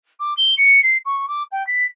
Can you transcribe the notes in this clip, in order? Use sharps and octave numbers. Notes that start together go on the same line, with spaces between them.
D6
G7
C#7
C7
C#6
D6
G5
B6